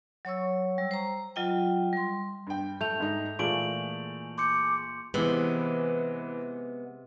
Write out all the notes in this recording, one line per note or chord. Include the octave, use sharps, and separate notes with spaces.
F#3 C#5 C#6 E6
G3
C5 A#5
F#3 F4 D#5 G5
G3 C6
G2 G5
A3 G6 F7
G#2 D#4
A#2 E3 G#3 A3 C#6 D7 F#7
C6 D6 G6 C#7
C3 E3 G#3 B3 B4